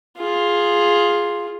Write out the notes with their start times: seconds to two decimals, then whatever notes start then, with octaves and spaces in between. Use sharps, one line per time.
0.18 F4 G#4